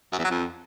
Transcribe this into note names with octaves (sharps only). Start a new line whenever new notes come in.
F#2
E2
F#3
F2